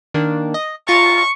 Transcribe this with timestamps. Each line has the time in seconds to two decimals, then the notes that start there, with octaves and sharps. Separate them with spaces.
0.14 D#3 A#3 D4
0.54 D#5
0.88 F4 A#5 C#6 A6